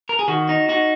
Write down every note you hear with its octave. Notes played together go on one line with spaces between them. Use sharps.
A#4
G#4
D#3 F#4
D#4
D#4 F#4